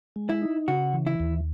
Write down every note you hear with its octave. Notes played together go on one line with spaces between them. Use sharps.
G#3
E4
D#4
C#3 F#4
E3
E4
D#2